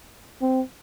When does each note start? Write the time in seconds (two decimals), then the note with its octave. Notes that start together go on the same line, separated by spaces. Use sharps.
0.42 C4